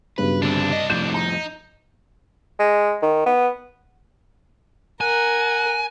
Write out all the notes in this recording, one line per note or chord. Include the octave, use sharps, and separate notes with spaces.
B1 G2 C#3 B4
C2 D3 C4 D4
D#5
F2 A2 G6 E7
D#4 A#5
G#3
D#3
B3
A#4 F#5 G#5